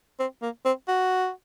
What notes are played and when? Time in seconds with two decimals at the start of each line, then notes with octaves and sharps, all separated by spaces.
0.19 C4
0.42 A#3
0.65 C4
0.88 F#4